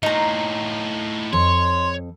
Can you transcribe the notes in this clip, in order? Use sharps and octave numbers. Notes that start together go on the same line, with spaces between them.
A2 D#4 F4 A#5
F2 C#5 C6